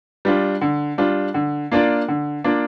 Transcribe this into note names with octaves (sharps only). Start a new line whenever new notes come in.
G3 D4 F4
D3
G3 D4 F4
D3
A#3 D4 F4 D5
D3
A#3 D4 F4 D5